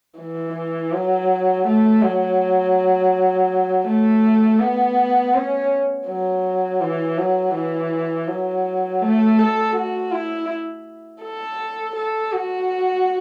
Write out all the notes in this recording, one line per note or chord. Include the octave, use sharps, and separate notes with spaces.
E3
F#3
A3
F#3
A3
B3
C#4
F#3
E3
F#3
E3
F#3
A3
A4
F#4
E4
A4
A4
F#4